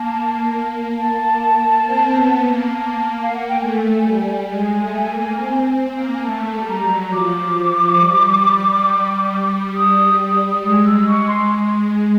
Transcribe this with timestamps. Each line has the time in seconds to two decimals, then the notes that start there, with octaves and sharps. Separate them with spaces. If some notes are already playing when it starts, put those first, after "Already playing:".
Already playing: A#3 A5
0.97 A5
1.85 C4
2.14 B3
2.43 A#3
2.73 A5
3.22 F5
3.34 F#5
3.48 G5
3.60 A3 G#5
4.04 G3
4.48 G#3 G#5
4.77 A3
5.06 A#3
5.36 C4
5.65 C4
5.94 A#3
6.13 G#5
6.23 A3 A5
6.53 G3
6.68 A#5
6.82 F#3
7.11 F3 D6
7.56 F3
7.99 G3
9.75 D#6
10.62 G#3 D#6
10.85 E6
11.07 C#6
11.27 C6